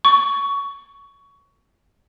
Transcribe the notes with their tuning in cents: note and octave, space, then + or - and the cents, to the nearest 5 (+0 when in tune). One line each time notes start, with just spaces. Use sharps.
C#6 +15